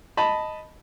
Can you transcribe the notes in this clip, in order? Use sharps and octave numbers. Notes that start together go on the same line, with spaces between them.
D#5 A5 B5